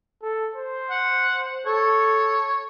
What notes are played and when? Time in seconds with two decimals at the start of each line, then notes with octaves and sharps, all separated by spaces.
0.22 A4
0.55 C5
0.90 F#5
1.67 A4 C#5